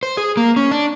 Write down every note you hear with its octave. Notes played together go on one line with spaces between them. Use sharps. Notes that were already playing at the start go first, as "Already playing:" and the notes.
C5
G#4
A#3
C#4
D4